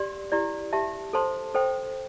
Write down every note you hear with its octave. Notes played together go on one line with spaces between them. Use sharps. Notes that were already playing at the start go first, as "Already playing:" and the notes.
Already playing: G4 D5 C6
E4 G4 D5
G4 E5 A5
A4 C5 A5 C6
A4 C5 G5